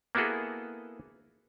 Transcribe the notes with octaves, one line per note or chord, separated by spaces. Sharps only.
A#3 B3 E4 F#4 G#4 A4